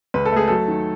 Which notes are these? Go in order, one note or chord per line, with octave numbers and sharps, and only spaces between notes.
C#2 B4
A4
A3 G#4
F#3 A4
D#3